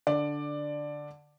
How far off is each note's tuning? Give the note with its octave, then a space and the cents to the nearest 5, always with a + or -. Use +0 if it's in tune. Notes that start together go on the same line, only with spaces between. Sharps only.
D3 +0 D5 +10